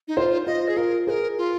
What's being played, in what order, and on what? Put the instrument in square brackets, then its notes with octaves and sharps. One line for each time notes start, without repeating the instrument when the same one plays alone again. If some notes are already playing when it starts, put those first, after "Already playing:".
[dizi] D#4
[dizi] F4 [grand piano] C5
[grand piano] F4 [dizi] D#5
[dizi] G#4
[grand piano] F4 [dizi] A#4
[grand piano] G#4 [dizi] A#4 C5
[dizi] F4